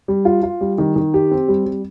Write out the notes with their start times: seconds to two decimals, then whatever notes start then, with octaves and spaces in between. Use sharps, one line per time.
0.08 G3
0.25 F4
0.43 F4
0.61 G3
0.78 D#3
0.96 D#3
1.14 G4
1.31 C4
1.48 G3
1.65 G3